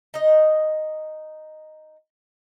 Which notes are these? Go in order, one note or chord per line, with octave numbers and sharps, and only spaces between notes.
D#4 D#5